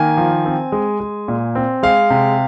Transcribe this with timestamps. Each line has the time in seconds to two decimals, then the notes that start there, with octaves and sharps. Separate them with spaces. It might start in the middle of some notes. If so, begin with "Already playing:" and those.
Already playing: D#3 A#3 G#5
0.17 F3
0.45 C4
0.72 G#3
1.00 G#3
1.28 A#2
1.55 C4
1.83 G#3 F5
2.10 C3